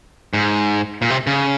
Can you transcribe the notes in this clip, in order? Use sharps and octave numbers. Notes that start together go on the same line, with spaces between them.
G#2
A#2
C3
C#3